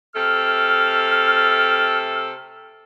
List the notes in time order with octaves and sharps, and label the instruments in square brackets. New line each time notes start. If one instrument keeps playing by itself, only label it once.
[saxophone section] C3 A3 A4 [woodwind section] F6